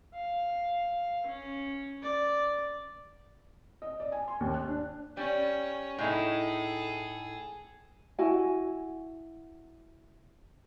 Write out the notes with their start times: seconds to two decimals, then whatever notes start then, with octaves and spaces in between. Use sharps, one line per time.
0.15 F5
1.27 C#4
2.03 D5
3.82 D#5
4.00 D5
4.12 G#5
4.28 C6
4.40 D#2
4.54 F#6
4.68 D4
5.17 G3 C#4
5.98 A2 D#4 E4 G#4 A4
8.19 E4 F#4 G#5